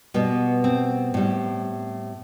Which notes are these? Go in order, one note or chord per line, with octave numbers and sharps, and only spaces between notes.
B2 G3 B3
C4
A2 G3